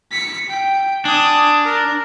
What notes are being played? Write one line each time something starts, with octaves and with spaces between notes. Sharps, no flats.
B6 C#7
G5
D4 G#5 D#6
A#4